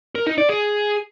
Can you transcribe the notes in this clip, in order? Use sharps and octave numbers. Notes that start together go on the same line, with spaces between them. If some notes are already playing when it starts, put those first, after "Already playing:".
A#4
D#4
D5
G#4